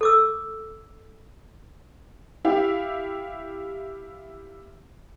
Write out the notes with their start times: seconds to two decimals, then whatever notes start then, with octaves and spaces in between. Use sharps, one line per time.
0.01 A4 D6 E6
2.45 E4 G4 F5